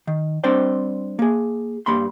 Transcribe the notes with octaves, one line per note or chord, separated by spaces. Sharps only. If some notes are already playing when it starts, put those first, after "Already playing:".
D#3
G3 C4 D4 C5 D5 G5
A#3 G#4
G2 G3 A#3 B5 C6